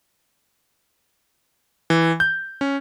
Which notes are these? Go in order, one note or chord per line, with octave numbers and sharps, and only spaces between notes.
E3
G6
C#4